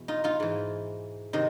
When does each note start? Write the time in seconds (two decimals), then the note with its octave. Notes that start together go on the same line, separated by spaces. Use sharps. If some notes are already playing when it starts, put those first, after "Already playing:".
Already playing: E2 B2
0.08 D#4 F4
0.24 D#4 F4
0.40 G#2 E3
1.33 C3 D#3 D#4